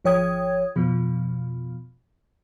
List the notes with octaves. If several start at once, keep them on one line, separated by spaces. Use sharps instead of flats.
G#1 F3 C#5 G5 D#6 G#6
F2 B2 F3